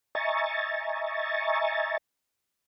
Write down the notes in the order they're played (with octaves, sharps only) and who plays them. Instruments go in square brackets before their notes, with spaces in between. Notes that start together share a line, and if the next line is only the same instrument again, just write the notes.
[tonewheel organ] D#5 E5 G#5 A#5 C#6 A6